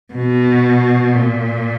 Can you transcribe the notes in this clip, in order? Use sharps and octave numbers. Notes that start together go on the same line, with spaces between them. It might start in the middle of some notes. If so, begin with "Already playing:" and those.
B2
A#2